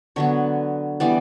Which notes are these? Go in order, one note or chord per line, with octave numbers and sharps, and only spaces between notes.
D3 F#3 B3 C#5
E3 G3 B3 D5